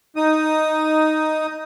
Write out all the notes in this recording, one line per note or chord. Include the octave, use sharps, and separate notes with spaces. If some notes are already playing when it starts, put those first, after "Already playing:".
D#4 D#6